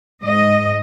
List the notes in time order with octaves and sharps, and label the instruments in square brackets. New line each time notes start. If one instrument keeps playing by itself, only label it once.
[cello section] G#2 D#5